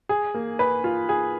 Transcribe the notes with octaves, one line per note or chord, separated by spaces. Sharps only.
G#4
A#3
B4
F4
G#4